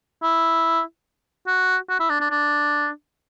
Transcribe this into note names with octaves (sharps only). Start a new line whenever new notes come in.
E4
F#4
F#4
E4
D4
D4
D4